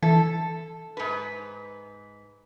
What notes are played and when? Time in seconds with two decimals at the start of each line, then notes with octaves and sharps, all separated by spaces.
0.03 E3 A4
0.97 G#2 B4